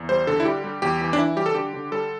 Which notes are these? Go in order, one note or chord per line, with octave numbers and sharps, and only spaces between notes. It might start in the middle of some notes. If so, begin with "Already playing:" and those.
Already playing: E2
G3 C5
D3 A4
E4
G3 G4
G3
E2 G4
E3
D4
E3 E4
G3 G4
A4
D3 G4
D3
G3 A4